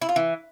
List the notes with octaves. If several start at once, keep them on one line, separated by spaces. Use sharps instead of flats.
E4
F4
E3